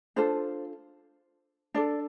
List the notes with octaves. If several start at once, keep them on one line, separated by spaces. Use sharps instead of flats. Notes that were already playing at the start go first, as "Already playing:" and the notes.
D4 F4 A4 C5
D4 A4 D5